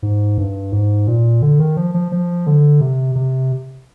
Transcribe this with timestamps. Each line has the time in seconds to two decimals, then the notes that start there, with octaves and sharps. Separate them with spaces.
0.02 G#2
0.38 G2
0.72 G#2
1.07 A#2
1.42 D3
1.59 D#3
1.77 F3
1.94 F3
2.12 F3
2.47 D3
2.81 C3
3.15 C3